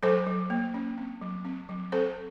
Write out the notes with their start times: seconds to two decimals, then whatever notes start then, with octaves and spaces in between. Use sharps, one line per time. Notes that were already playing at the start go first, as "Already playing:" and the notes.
0.03 F#3 A4 C5
0.27 F#3
0.50 A#3
0.74 C#4
0.98 C4
1.21 F#3
1.45 C4
1.69 F#3
1.92 C4 A4 C5